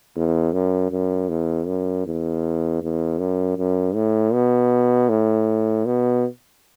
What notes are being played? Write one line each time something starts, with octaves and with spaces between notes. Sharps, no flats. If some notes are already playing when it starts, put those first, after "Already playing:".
E2
F#2
F#2
E2
F#2
E2
E2
F#2
F#2
A2
B2
A2
B2